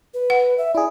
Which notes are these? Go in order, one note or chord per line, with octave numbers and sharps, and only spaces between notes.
B4
F#5
E5
E4 G#4 D5